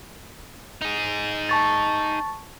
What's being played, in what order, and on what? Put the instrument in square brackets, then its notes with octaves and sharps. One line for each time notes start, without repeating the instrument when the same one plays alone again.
[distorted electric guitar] D#4 G#4
[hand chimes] A5 C#6 A6